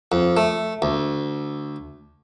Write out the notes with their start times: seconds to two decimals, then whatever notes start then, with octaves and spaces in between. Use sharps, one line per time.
0.12 F2
0.37 A3
0.82 D2